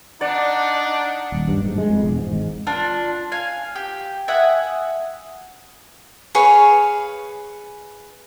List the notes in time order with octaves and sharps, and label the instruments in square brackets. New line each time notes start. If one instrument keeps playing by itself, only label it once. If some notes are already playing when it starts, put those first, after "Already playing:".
[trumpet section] D4 [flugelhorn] D#4 [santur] D5 [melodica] F#5
[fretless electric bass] D#1
G2
G#2
G#3
F2
E1
G#2
G#1
[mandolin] D4 F4
F5 G#5
G4
E5 F#5 G#5 D#6
[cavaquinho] G#4 B4 C#5 F5